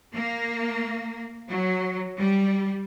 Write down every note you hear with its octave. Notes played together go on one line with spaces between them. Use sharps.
A#3
F#3
G3